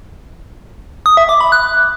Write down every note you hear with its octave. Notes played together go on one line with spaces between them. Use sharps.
D#6
E5
D6
B5
F#6